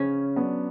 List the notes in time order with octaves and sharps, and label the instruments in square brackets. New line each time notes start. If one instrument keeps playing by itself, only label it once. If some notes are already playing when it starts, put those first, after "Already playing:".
Already playing: [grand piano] C#3 [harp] C#4
[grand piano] F#3 B3 D4